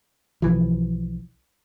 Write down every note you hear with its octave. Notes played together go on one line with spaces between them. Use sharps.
B1 E3 F3